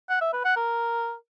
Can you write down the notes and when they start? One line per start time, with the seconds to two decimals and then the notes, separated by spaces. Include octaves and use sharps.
0.09 F#5
0.21 E5
0.33 B4
0.45 F#5
0.56 A#4